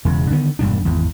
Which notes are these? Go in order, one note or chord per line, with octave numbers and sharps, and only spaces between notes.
E1 E2 C#3
D3 D#3 B3
E1 G2 A#2 D4
G#1 E2